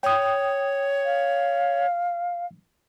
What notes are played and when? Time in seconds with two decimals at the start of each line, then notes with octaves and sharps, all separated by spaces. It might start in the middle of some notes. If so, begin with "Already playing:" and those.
0.03 C#5 G5 D#6
1.05 F5